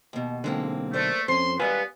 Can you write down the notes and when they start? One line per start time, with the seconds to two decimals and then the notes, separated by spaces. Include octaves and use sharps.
0.13 D#2 B2
0.44 B1 D3 G#3 A#3 C4
0.93 A3 A#4 C5 D5
1.28 F2 C#4 C5 C6
1.59 G3 B3 B4 D5 F5 G#5